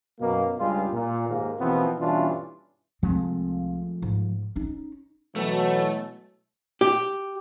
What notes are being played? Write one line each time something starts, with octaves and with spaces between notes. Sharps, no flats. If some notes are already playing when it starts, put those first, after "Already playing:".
F#2 B2 A#3
C#2 G2 G3 G#3 F4
A#2
D#2 G#2 A#3
D#2 B2 E3 F3 B3 C4
G2 B2 E3 C#4 D4 F4
C2 F3 G#3 A3 C4
G#2
C#4 D#4
B2 E3 F#3 A3
G4